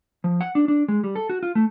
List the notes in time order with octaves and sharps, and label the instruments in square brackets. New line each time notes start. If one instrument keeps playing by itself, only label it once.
[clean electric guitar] F3
F#5
D4
D4
G#3
G3
A4
F#4
F4
A3